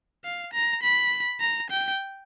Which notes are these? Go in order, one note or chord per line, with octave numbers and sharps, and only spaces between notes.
F5
A#5
B5
A#5
G5